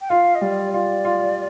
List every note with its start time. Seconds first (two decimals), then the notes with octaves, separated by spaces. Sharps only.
0.01 G5
0.10 F4 F5
0.35 D#5
0.41 G3 D5
0.73 F4 D5
1.05 F4